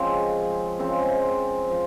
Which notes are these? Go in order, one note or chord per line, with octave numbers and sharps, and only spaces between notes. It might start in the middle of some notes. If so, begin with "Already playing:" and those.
Already playing: C#3 F3 G#3 C4
C#3 F3 G#3 C4
F3